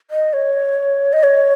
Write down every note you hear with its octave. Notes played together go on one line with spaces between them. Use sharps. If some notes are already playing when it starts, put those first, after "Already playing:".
D#5
C#5
D#5
C#5